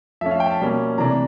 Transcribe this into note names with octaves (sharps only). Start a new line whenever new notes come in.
F3 A3 C#4 E5
F5
G5
A5
B2 G3 A#3 C#4
C3 E3 A3 D4 A#5